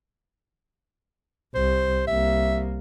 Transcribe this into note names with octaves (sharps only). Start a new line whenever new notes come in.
C2 C5
C2 A#3 E5